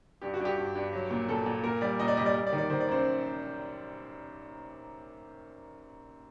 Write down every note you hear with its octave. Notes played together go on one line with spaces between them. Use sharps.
G2 G4
F#4
G2 G4
G2
G2
F#3
A#2
A#2 A4
A#2
A#2 A#4
G3 D5
A#2 D#5
D5
G3 D#5
D5
G3
D5
D#3
D5
D#3 C5
D5
F#2 C5